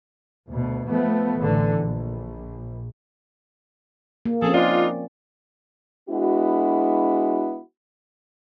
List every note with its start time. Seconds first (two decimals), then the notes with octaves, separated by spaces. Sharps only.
0.49 D2 B2
0.87 F3 A3 B3
1.41 A1 D3 E3
1.81 A#1
4.26 A#3
4.42 F3 C4 C#4 G#4 A4
4.54 D4 D#4 F4 D5
6.10 G#3 B3 D4 E4 F#4